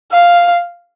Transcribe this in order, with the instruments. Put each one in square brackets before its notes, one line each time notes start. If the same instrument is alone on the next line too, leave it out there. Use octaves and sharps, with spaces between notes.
[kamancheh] F5